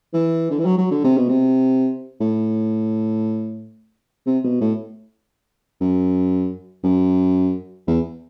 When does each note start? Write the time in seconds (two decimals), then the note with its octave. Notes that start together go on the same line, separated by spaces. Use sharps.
0.13 E3
0.50 D3
0.59 E3
0.65 F#3
0.78 F#3
0.91 D3
1.04 C3
1.17 B2
1.29 C3
2.21 A2
4.26 C3
4.44 B2
4.61 A2
5.81 F#2
6.84 F#2
7.88 E2